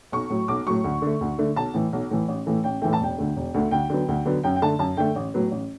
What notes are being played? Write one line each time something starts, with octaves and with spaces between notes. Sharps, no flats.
B1 C#6
A2 F#3
B1 D6
A2 F#3 C#6
D2
D3 A3
D2
D3 A3
B1 A5
A2 E3
B1
A2 E3
A1
A2 E3 A3
A1 G5
A2 E3 A3 G5
A5
E1 G5
D2 D3 A3
E1
D2 D3 A3
D2 G5
D3 F#3 B3
D2
D3 F#3 B3
F#2 G5
G5
D3 A3 A5
F#2 A5
D3 A3 G5
A1
A2 F#3 B3
A1